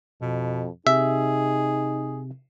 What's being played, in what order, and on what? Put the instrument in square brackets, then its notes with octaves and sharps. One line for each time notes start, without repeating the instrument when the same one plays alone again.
[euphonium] F2 [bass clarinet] B2
[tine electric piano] C3 [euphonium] D#4 [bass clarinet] G#4 [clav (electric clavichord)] E5